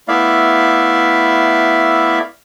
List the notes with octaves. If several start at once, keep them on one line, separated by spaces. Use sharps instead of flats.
A3 B3 E4 D5 E5 F5